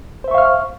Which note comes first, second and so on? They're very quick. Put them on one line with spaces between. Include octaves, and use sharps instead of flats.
C5 E5 C#6 F5 F6